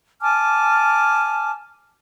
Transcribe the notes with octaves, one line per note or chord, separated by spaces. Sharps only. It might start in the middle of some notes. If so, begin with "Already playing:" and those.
G#5 A5 D6 F6